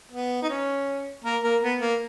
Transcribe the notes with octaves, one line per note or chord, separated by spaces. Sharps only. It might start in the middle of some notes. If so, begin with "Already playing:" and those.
B3
D#4
C#4
A#3 A#4
A#3 A#4
B3
A#3